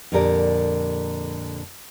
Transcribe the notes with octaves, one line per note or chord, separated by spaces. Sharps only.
F2 A#2 D3 G4 A#4 D5